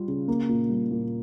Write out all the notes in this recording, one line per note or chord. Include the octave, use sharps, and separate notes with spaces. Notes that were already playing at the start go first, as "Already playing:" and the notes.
Already playing: G3 F4
C#3
A#3
A#2
G3
A#2